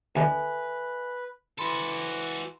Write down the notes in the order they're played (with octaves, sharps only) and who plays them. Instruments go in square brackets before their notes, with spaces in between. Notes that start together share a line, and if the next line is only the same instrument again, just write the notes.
[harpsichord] D2 B2 D3 [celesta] A4 E5 G#5 [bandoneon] B4
[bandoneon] E3 [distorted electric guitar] F#4 A4 [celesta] B5 C6